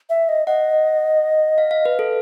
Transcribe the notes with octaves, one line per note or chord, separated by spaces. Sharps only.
E5
D#5
D#5 F#5
F5
F5
B4
A4